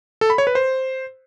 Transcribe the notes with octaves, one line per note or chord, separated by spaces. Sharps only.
A4
B5
C#5
B4
C5